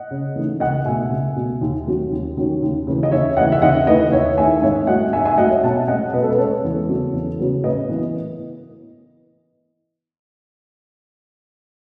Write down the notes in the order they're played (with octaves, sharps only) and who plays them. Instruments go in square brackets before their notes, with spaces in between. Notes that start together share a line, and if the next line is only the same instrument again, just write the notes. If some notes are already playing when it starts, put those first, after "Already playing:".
Already playing: [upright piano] D#5 F#5
C#3
E3 A3 D#4
C#2 D#5 F#5
B2 A3 E5 G#5
C#2
B2 A3
D#2
D#3 F#3 C#4
D#2
D#3 F#3 C#4
D#2
C#3 E3
D#5
D#2 C#5 E5
C#3 E3 D#5 F#5
E5
D#2 D#5 F#5
D#3 A3 E4 B4 D#5
D#2 C#5 E5
D#3 A3 E4 E5 G#5
G#2 C#5 E5
F#3 A3 D#5 F#5
G#2 E5 G#5
E5 G#5
F#3 A3 D#5 F#5
C#5 E5
B2 F#5 A5
G#3 C#4 D#5 F#5
B2 B4 D#5
A4
B4
C#4 A4 C#5
G#3
E2
C#3 F#3 B3
E2
C#3 F#3 B3
A2 B4 D#5
E3 B3